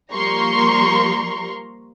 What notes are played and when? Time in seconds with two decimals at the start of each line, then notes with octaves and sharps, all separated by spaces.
0.13 F3 G3 A#3 A#5 C6 C#6